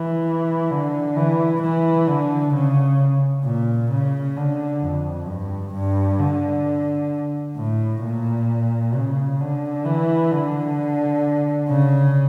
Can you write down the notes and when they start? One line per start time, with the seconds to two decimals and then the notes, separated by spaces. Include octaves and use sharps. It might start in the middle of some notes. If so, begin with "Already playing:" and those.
Already playing: E3
0.71 D3
1.17 E3
1.62 E3
2.07 D3
2.54 C#3
3.45 A#2
3.91 C#3
4.37 D3
4.82 F2
5.28 G2
5.74 G2
6.19 D3
7.57 A2
8.03 A#2
8.94 C#3
9.40 D3
9.85 E3
10.31 D3
11.69 C#3